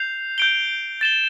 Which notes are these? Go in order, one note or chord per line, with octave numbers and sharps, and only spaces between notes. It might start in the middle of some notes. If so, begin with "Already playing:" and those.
Already playing: G6 C7 F7
G6 D7 G7
A6 E7 G7